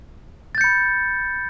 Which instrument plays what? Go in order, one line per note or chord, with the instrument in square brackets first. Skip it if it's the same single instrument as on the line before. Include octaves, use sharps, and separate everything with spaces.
[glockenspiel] A6
G6
C#7
B5